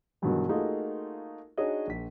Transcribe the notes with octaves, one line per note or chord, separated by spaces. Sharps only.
G2 B2 D#3 E3 F#3 G#3
A3 A#3 D#4 F4 F#4 G#4
D4 D#4 F#4 G#4 C#5 D#5
A#1 B6